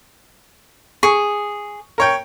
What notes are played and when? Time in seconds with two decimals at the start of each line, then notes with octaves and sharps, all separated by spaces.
1.03 G#4 C#6
1.98 A#4 C#5 G5